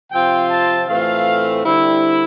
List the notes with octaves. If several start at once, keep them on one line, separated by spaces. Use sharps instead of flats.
C3 F3 C4 F4 G5
A5
A2 E3 A3 C4 F4 F5
D3 G3 C4 E4